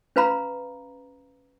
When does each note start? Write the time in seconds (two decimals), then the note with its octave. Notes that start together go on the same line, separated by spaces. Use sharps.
0.16 C#4 B4 F5 A#5 B5